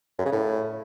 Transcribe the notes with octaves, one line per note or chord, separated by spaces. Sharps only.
F#2
C#3
A2